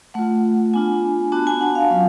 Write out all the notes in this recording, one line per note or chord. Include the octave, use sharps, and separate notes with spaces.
A3 F4 F#5
B3 D4 F4 G#5
B3 D4 F#4 A5
G#5
F#5
F5
F#3 C#4 F4